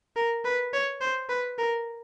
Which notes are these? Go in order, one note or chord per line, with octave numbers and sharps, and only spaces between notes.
A#4
B4
C#5
C5
B4
A#4